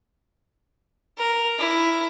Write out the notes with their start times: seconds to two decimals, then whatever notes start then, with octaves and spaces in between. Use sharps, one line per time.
1.18 A#4
1.59 E4